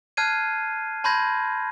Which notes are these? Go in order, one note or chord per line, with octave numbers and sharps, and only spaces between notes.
A5 F6 F#6 G#6 C7 D#7
A5 B5 C6 G6 G#6 A#6